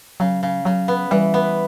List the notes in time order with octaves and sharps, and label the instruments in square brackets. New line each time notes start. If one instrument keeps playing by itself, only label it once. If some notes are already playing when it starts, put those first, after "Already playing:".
[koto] C#3 [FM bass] F#3
[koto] C#3
[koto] C#3 [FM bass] F#3
[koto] B3
[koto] E3 [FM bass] G3
[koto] B3